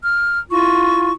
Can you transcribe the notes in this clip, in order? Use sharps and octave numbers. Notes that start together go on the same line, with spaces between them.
F6
E4 F4 C#6